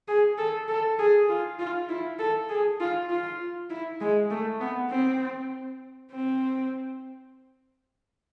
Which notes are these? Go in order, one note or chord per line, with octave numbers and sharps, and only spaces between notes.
G#4
A4
A4
G#4
F4
F4
E4
A4
G#4
F4
F4
E4
G#3
A3
B3
C4
C4